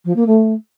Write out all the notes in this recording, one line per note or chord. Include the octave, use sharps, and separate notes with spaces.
F3
A#3
A3